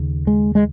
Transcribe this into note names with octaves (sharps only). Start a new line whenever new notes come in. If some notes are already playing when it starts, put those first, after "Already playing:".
Already playing: D#2 C#3
G#3
G#3